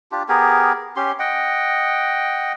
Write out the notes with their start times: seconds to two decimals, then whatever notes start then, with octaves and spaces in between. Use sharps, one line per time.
0.12 D4 F4 G4
0.29 B3 G4 G#4 A#4
0.96 C#4 G4 C6
1.19 D#5 F#5 G5